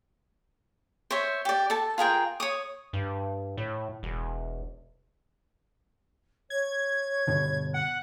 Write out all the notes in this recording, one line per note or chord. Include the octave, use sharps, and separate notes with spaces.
C5 C#5 E5
G4 D5
A4 A5
F4 G#4 A#4 G5
C#5 D#6
G2
A2
E1
C#5 G#6
G2 B2 D3
F#5 F#6